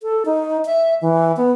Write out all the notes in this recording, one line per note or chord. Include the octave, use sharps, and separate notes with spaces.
A4
D#4
E5
E3
B3